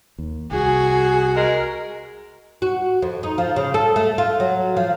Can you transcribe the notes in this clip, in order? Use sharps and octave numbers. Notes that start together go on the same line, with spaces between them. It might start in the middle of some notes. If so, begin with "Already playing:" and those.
D#2
C2 F#4 G#4
G#3 A#4
F#4
F2
D#4
F3
C#3
A4
A3
F4
F#3
F3